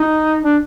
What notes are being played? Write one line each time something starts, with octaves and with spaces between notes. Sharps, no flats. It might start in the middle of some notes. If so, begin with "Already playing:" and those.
Already playing: D#4
D4